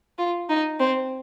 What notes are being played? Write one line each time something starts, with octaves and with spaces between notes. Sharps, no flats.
F4
D#4
C4